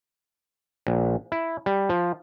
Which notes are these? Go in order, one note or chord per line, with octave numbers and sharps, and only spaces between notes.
A#1
E4
G3
F3